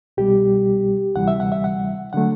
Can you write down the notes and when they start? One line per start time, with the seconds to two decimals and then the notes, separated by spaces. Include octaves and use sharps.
0.17 C2 B2 G3 G4
1.15 D2 C3 E3 G3 F#5
1.28 E5
1.40 F#5
1.52 E5
1.64 F#5
2.13 D3 F#3 A3 F#5